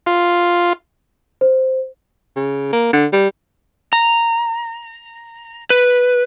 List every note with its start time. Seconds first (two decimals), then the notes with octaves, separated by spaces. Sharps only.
0.06 F4
1.41 C5
2.36 C#3
2.72 A#3
2.93 D3
3.12 G3
3.93 A#5
5.70 B4